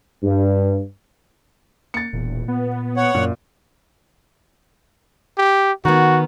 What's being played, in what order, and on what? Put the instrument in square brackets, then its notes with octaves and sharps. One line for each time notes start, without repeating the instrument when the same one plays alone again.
[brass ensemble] G2
[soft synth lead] A#3 [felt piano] A6 C#7
[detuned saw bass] E1 [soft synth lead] A#2
[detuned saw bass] B3
[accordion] C#5 F#5
[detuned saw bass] F#2 [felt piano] A#2
[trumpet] G4
[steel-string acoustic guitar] D#3 B3 [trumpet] F#4